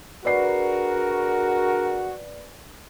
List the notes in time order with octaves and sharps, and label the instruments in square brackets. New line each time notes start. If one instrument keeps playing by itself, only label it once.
[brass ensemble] D4 G#4 A#4 [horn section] F#4 [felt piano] B4 D5 C7